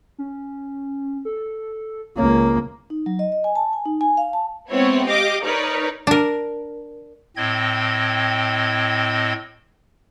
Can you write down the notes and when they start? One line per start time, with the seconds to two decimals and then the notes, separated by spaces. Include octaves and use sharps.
0.18 C#4
1.25 A4
2.17 C#2 A#3 C#5
2.90 D#4
3.06 F#3
3.19 D#5
3.32 D#5
3.44 G#5
3.55 A5
3.73 G#5
3.86 D#4
4.01 G#5
4.17 F5
4.33 A5
4.71 G#3 B3 C4 E4 C#5
5.06 G4 D#5 F5 D6
5.43 D#4 A#4 B4 C#5 D5
6.07 D4 A#4
7.36 A2 C4 D#5 G5 G#6